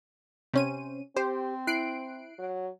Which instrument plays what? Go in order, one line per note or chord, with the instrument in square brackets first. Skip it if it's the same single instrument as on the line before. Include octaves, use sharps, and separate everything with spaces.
[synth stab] C3 C#4 D#7 [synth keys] C5
[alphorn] C4 [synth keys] G4 [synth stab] C5
[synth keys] E4 [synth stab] F#6 C7 D7
[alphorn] F#3